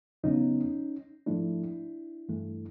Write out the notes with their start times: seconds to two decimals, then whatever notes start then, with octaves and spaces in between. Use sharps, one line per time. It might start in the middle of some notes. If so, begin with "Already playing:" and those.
0.24 E2 C#3 F#3 B3 C#4 D#4
1.26 G#2 F3 A3 D4 E4
2.29 G2 E3 A3